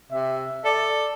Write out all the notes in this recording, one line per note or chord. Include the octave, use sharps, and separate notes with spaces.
C3 E5
A4 D5